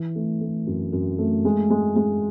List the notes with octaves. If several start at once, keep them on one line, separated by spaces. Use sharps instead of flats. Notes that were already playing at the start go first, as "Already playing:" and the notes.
Already playing: E3
A3
A3
F#2
F#2
A3
G#3
G#3
G#3